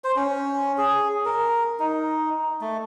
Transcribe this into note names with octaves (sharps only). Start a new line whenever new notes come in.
C5
C#4
G#4
A#4
D#4
A3